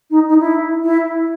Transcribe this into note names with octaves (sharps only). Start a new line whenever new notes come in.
D#4
D#4
E4
E4